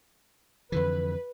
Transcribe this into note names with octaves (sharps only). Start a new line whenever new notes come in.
F2 D3 E3 B4